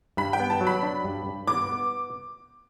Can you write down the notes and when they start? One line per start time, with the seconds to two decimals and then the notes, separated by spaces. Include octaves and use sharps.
0.17 G2 B5
0.33 G5
0.40 B3
0.50 A5
0.61 F#3
0.67 B5
0.83 D4
1.04 G2
1.26 G2
1.47 B3 D6
1.69 B3